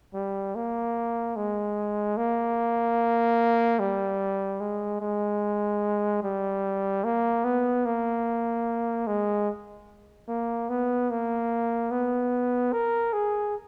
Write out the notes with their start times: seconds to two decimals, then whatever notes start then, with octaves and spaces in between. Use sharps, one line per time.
0.14 G3
0.55 A#3
1.36 G#3
2.17 A#3
3.79 G3
4.61 G#3
5.01 G#3
6.23 G3
7.04 A#3
7.44 B3
7.85 A#3
9.07 G#3
10.28 A#3
10.69 B3
11.10 A#3
11.91 B3
12.73 A#4
13.13 G#4